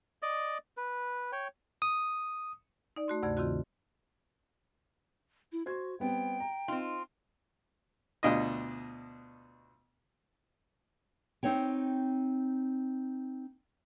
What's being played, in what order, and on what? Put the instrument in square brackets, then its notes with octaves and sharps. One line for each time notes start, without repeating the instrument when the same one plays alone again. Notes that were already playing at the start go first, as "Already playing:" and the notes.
[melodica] D5 D#5
B4
C#5 G5
[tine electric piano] D#6
[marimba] D#4 D5
A3 F#4 C6
D2 G2 C3 A3 D5 G#6
C3 D#3 C4 F4 F#4
[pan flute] E4
[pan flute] F#4 [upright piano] C5 C6 G#6
[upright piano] G3 B3 C4 [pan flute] G5
[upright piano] A#5
[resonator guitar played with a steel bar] C4 F4 [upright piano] D#4
[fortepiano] D2 B2 D4 F4 D#5
[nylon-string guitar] C4 D#4 C#5 G5